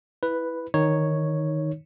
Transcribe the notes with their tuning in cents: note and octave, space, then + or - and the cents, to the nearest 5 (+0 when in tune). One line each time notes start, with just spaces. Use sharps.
E4 +0 B4 +0
D#3 +0 D#4 +0 C#5 +0